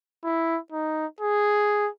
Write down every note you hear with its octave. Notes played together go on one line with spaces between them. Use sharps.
E4
D#4
G#4